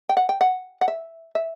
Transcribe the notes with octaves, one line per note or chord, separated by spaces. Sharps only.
G5
F#5
G5
F#5
F#5
E5
E5